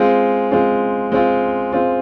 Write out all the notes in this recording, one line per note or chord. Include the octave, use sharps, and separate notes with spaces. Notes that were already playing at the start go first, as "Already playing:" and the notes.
Already playing: G#3 C4 F4
G#3 C4 F4
G#3 C4 F4
G#3 C4 F4